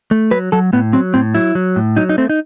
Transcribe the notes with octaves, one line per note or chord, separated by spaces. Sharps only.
A3
F#3 B4
F#3 A4
A2 B3
F#3 C4
A2 C4
F#3 E4
F#3
A2
F#3 D#4
D#4
A3 C4
D#4